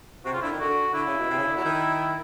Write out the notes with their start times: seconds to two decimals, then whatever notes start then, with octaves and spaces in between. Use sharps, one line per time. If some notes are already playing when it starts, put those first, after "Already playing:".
0.24 C3 F#4
0.33 C#3 F4
0.42 D3 E4
0.50 D#3
0.59 D3 F#4
0.94 D3 E4
1.05 C#3
1.17 B2
1.29 C3
1.38 C#3
1.46 D3
1.55 F#3
1.64 D#3